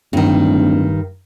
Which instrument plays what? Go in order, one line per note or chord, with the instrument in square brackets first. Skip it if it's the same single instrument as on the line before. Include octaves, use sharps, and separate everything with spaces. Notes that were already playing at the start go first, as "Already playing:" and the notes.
[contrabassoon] D1 [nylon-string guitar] G2 D#3